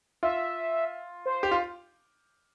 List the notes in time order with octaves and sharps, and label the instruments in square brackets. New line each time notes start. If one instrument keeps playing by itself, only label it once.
[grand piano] F4 [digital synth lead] E5
[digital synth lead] C5
[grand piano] G4
F4